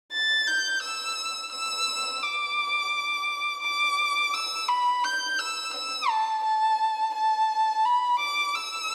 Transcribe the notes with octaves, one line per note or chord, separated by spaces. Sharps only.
A6
G6
E6
E6
D6
D6
E6
B5
G6
E6
E6
A5
A5
A5
B5
D6
E6